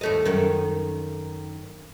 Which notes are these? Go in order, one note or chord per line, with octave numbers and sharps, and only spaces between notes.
D#2 A3 D#5
F#2 D#3